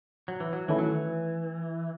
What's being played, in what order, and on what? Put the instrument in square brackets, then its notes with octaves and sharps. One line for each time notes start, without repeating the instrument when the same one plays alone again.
[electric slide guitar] F#3
E3
F#3
[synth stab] D#3 A3 C#4 E4 [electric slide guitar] E3
[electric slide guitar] F#3
E3